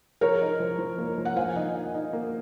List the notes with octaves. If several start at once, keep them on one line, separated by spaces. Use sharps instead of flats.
F3 A#4 C#5
D#4
F3
F3
A#3
F3
F#5
F3 F5 G#5
D#4
D#4
D#4
A#3